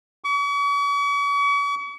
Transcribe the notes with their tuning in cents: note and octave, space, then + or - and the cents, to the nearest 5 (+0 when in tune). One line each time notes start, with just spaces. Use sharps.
C#6 +45